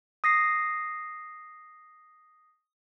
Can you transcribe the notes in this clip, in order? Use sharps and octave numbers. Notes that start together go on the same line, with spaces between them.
D#6 A#6 C7